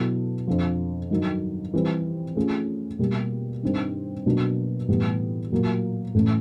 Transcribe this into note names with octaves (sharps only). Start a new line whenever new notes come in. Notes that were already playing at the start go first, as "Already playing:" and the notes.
Already playing: B2 F#3 B3 E4 A4
F2 D3 F3
G2 D#3 F#3
E3 G3 C4
A3 C#4 F4 G#4
B2 G3 A#3
G2 D#3 G3 C4
B2 F#3 A#3 D4 F#4
A2 E3 G3 B3
A#2 F#3 A#3
A2 E3 A3 C#4